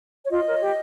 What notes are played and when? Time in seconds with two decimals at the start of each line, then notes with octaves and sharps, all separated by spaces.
0.25 C#5
0.30 F4 D#5
0.45 A#4 C#5
0.60 G4